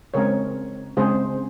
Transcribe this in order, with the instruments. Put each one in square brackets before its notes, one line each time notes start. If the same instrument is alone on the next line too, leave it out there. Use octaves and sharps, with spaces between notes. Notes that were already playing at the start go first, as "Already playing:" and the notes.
[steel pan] C#3 G#3 C4 A#4 C#5
C#3 G#3 C4 G#4 C5